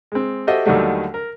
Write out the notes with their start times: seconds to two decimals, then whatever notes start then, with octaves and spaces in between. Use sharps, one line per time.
0.12 G#3 C4
0.47 F#4 G4 A4 C5 D#5 E5
0.66 D#2 D3 D#3 F#3 G3 A3
1.14 A#4